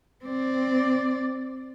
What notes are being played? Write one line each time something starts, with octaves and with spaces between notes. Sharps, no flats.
C4 D5